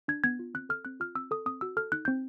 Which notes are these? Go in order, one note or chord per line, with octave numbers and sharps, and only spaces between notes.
D4 G#6
B3 G#6
F4
C4 F#6
A4 F6
C4 F#6
F4 F6
C4 E6
A4 D#6
C4 D#6
F#4 E6
A4 F6
D#4 F#6
C4 G6